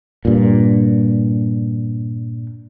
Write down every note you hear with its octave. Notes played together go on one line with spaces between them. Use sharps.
G2 A#2